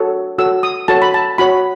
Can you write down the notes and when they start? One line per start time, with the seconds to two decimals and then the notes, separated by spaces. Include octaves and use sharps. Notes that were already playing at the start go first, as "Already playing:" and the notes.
Already playing: F#4 A4 C#5
0.38 F#4 A4 C#5 E6
0.63 D#6
0.88 F#4 A4 C#5 A5
1.02 B5
1.14 A5
1.38 F#4 C#5 B5